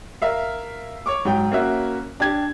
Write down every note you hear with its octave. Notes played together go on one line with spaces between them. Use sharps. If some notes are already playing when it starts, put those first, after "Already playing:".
A#4 E5 F5
C#5 C#6 D6
G#2 F#3 G5
A#3 C#4 F#4 E5
D4 G4 G#6